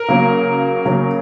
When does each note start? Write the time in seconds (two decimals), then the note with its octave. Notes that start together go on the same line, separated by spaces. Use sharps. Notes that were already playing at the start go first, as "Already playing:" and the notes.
Already playing: A#4
0.09 C#3 F#3 A#3
0.85 C#3 F#3 A#3